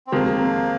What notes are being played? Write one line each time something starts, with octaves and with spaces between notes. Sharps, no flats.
C4
F2 C3 D#3 G#3 A#3